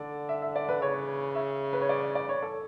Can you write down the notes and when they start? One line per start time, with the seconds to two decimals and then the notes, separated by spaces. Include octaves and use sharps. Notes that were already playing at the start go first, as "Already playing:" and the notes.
Already playing: D3 D5
0.29 E5
0.42 E5
0.56 D5
0.69 B4
0.82 C#3 C#5
1.35 E5
1.73 B4
1.81 C#5
1.89 D5
2.15 D5
2.29 C#5
2.42 A4